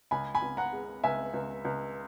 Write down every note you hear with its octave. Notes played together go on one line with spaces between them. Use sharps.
C#2 G#5 B5
G#5 B5
C#2
F#5 A#5
G#3
C#2 E5 G#5
C#2
C#2